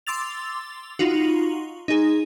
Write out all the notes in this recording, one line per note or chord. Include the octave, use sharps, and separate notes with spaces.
C6 D6 E6 A6 F7
D#4 F4 F#4
D#4 G#4